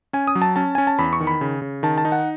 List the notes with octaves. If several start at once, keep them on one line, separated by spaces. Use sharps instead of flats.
C#4 G#5
D#6
F#3
A5
C#4 A5
C#4 G#5
A5
E2 B5
C#6
D#3
B5
C#3
C#3
D#3 A5
A5
D#4
F#5